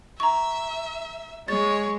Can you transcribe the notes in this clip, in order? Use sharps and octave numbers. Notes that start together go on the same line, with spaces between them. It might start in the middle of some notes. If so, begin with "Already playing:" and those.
E5 A#5 C#6
G#3 C#5 A6